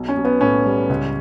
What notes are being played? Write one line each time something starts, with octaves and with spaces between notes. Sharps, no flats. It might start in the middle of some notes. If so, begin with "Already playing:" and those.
Already playing: B1
C#4
B1
B3
A2 C#4
G3
C#2